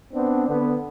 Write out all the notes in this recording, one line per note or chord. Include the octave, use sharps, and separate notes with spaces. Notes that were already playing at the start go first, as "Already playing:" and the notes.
B3 C4 D4
D3 B3